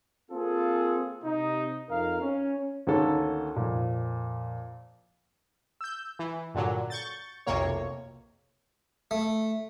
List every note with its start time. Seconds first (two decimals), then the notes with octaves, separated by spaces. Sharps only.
0.31 A#3 C4 F4 G#4 A4
1.24 C3 D#4
1.90 F2 D#4 A#4 F5
2.21 C#4
2.87 D2 D#3 A#3 C#4 A4
3.56 F2 A#2
5.81 E6 G6
6.19 E3
6.55 G2 A#2 D3 F#3
6.90 C#6 G6 A6
7.47 B1 F2 C3 A#3 C#5
9.11 A3